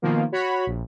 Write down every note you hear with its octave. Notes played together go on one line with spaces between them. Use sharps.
B2 D#3 F3 A#3
F#4 C#5 B5
A#1